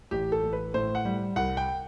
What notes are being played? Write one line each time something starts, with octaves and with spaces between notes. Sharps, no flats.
A1 G4
A4
A1
B4
A2 C5
F#5
G3
C2 F#5
G5